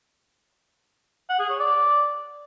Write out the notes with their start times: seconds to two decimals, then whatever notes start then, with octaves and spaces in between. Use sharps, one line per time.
1.29 F#5
1.39 G#4
1.50 C#5
1.60 D5